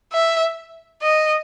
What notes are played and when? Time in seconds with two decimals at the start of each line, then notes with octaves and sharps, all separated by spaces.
0.13 E5
1.02 D#5